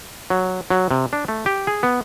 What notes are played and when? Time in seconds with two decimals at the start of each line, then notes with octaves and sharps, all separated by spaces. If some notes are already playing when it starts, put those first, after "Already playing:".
0.30 F#3
0.70 F#3
0.91 C3
1.13 D4
1.28 A3
1.46 G4
1.67 G#4
1.83 B3